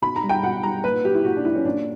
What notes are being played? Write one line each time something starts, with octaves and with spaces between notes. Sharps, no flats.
B2 B5
A#5
G3
G5
B2 F#5
G3 A#5
A#2 B4
F#3 G4
E4
A#2 F#4
D4
F#3 E4
C#4
A#2 D4